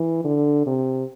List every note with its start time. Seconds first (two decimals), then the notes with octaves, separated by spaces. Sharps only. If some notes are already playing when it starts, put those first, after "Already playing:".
Already playing: E3
0.24 D3
0.66 C3